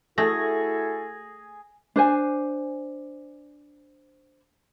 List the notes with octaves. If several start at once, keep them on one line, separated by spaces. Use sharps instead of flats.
A3 E4 F#4 G#4 A4 G#5 A#6
D4 C5 G#5